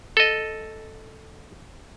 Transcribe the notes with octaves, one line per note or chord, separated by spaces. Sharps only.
A4 D#5